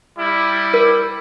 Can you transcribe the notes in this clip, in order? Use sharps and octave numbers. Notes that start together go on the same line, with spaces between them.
G3 E4
A#4